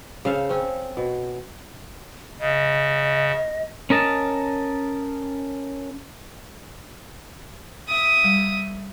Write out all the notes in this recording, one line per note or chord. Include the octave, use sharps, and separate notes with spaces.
C#3 A4 C5 F5
C4 C#4
B2
C#3 D#5
C#4 A#4 D#5 A5
E5 D#6
G3